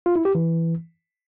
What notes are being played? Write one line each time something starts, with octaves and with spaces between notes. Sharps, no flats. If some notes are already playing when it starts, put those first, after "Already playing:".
F4
E4
G4
E3